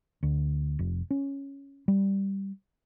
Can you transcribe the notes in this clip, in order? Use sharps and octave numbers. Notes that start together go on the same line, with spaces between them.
D2
F1
C#4
G3